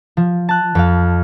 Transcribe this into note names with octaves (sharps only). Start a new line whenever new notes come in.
F3
A5 F#6
F2 F5